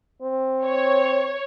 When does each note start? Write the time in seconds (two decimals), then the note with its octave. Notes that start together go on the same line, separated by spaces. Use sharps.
0.22 C4
0.66 C#5